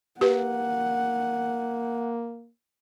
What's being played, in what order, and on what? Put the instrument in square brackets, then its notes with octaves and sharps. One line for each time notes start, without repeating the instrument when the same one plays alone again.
[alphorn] A#3 [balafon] G4 B4 [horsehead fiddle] F#5